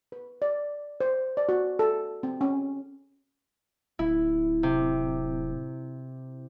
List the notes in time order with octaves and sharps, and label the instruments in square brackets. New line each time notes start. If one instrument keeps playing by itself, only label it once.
[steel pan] B4
D5
C5
D5
F#4
A4
C4
C#4
[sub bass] D1 [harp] E4
[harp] C3